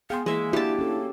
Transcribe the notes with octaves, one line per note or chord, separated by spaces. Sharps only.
B3 G#4 F5 G5 C6
E3 G#3 A#3 E5
D4 E4 F#4 G4 A5
C#4 A4